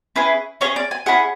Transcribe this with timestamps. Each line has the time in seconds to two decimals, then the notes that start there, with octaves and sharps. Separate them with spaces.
0.16 C#4 E4 G#4 B4
0.61 C#4 E4 G#4 C#5
0.76 D5
0.91 G#5
1.06 C#4 E4 G#4 F#5